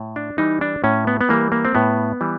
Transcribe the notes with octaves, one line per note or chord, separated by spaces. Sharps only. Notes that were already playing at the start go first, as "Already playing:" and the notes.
Already playing: A2
D4
E3 G3 D#4
D4
A2 C#4
B3
B3
E3 G3 A#3
A#3
C4
A2 B3
E3 G3